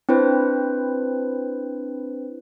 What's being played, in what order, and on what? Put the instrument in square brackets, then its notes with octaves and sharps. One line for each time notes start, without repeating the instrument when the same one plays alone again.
[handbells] C4 D4 E4 B4 C5